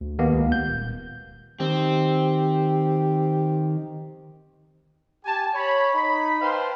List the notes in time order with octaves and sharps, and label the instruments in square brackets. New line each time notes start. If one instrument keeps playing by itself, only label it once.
[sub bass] D2
[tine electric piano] D#2 A#3 B3
[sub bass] C#2
[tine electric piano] G6
[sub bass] D#1
[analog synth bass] D#3 [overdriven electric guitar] C4 [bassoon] G4
[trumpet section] G4 G#5 A5
C#5 B5
D#4 B5
B4 C5 F5 G5 A5 C6